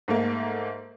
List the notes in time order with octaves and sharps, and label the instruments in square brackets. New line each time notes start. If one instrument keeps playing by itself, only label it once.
[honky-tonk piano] G#2 A3 A#3